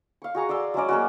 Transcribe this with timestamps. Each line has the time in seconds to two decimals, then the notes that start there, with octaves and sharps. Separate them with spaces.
0.22 F5 C#6
0.35 F#4 G#4 A#5 C#6
0.49 D5 F5 C6 E6
0.74 F#3 G#3 C#4 D5
0.89 A#3 C#4 F#4